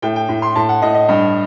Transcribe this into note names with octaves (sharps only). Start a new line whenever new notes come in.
A2 G5
G5
A2
C6
A2 A5
F#5
A2 D#5
D#5
G2